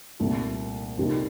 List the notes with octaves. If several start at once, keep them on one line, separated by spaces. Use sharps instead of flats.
C2 A#2 A3
F2 C3 G3 A#3 D#4